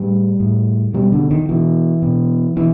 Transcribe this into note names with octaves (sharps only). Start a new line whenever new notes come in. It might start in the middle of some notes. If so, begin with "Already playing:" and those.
Already playing: A2 G3
A2
B2 G3
D3
D#3
B2 E3
B2
B2 E3